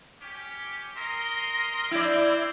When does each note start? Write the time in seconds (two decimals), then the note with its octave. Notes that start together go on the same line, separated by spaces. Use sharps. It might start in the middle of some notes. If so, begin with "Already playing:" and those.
0.22 C#4 G4
0.96 A#4 D#5 C6
1.91 C4 E4 D5